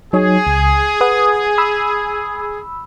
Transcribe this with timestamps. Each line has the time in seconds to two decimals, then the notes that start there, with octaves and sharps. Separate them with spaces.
0.13 F#3 D#4 G#4 C#5
0.47 C#2
1.01 B4 F#5 D#6
1.58 B5 E6